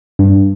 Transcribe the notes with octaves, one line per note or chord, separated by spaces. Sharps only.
G2